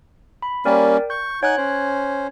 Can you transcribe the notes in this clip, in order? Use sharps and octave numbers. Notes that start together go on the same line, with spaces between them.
B5
G3 A#3 C#4 A#4 D5 G5
C#6 G6
D#4 C#5 F#5 G#5 F#6
C#4 C5